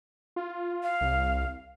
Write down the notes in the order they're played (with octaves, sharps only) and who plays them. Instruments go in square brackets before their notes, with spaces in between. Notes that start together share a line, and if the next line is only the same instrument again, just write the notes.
[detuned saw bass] F4
[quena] F5
[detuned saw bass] C2